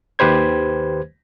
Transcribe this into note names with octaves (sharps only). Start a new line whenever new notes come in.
D#2 D#3 G4 B4 C5 G#6